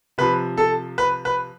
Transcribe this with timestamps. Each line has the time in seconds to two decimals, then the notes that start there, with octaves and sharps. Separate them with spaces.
0.18 C3 F3 B4
0.57 A4
0.98 B4
1.25 B4